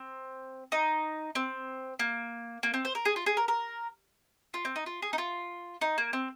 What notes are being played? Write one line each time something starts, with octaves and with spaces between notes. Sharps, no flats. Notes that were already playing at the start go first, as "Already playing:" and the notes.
Already playing: C4
D#4
C4
A#3
A#3
C4
C5
A#4
G#4
F4
G#4
A#4
A#4
F4
C4
D#4
F4
G#4
D#4
F4
D#4
A#3
C4